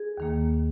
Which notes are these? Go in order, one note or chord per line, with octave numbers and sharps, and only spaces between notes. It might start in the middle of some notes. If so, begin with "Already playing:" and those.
Already playing: G#4
D#2 D#3 A#3